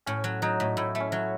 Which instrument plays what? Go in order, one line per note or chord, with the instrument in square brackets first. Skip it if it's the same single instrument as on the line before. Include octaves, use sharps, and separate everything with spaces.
[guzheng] A2 [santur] C#4
[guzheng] F#3
[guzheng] F#3 [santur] D#4
[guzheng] A2
[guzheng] A2 [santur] E4
[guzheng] A3
[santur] C#4
[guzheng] F#3